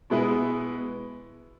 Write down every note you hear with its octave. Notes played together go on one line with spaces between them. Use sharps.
B2 G#3 B3 E4 B4